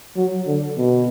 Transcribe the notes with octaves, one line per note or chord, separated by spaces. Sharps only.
F#3
D3
B2